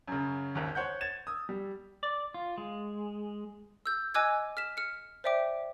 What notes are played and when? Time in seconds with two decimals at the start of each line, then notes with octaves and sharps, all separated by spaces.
0.08 F#2 C#3
0.55 G#1 D#2
0.75 C5 C#5 F#5 G6
1.01 G#6 A6 E7
1.27 D#6 E6
1.49 G3
2.03 D5
2.34 F4
2.58 G#3
3.86 E6 G6
4.14 D#5 G#5 D6 E6 F#6 G#6
4.57 F6 B6 E7
4.77 F6 C#7
5.24 C5 D5 E5 G5 D6